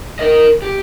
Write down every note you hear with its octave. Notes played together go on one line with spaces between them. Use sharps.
A#4 D#5
G4